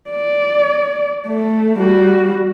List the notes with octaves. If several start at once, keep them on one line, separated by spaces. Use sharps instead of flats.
D5
A3
G3 F#4